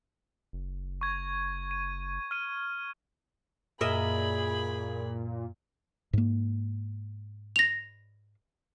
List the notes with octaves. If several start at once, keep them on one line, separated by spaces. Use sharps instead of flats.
F#1
C#6 G#6
D#7
F6 D#7
F#2 A#2 G#4 A#4 D#5 E5 B5
G#2 A#3
A#6 F7